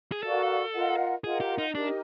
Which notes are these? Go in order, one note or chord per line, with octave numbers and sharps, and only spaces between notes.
G#4
F#4 A4 A#4 D5 F5
F4 A#4 D#5 F#5
F4 G#4 A#4 D#5 F#5
G4
D#4
D4 D#4 G4 A#4 D#5